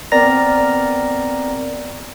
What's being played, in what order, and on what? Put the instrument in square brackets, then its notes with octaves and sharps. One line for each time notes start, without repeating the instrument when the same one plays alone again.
[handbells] B3 C4 A#4 D5 A#5 A#6